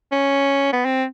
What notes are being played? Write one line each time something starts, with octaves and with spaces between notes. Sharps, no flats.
C#4
B3
C4